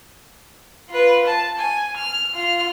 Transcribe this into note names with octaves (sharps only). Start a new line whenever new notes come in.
F4 B4
A5
G#5
F6
F4 F6